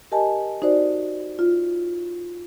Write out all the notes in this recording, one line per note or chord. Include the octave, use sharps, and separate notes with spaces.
G4 A#4 D#5 G#5 A5
D#4 F#4 C5 D5
F4